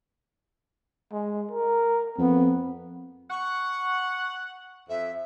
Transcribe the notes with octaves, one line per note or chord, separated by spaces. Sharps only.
G#3
A#4
F2 B3
F#5 C#6
F2 E5